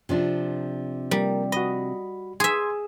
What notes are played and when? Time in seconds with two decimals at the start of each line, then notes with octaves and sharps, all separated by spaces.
0.09 C3 F3 D4
1.11 G3 A#3 A#4
1.52 F#4 D#5 B5
2.40 G#4 E5 C6 G#6